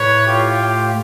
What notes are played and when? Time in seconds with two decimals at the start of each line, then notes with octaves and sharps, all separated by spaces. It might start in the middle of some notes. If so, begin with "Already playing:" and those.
Already playing: A2 B4 C#5
0.27 F4 G4